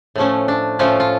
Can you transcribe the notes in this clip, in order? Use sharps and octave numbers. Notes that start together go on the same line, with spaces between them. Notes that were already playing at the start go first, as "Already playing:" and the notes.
A2 F3 A3 C#4
D4
A2 F3 A3 C#4 F4
F4